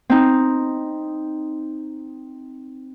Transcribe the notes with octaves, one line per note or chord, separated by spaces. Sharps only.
C4 D#4